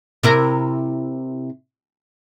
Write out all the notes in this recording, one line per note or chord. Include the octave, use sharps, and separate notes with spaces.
C3 E4 A#4